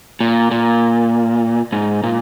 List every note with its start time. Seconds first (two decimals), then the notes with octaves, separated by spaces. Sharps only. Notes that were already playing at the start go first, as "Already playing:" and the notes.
0.20 A#2
0.51 A#2
1.72 G#2
2.03 A#2